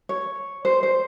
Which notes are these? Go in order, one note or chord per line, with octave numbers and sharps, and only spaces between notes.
C#5
C5
C5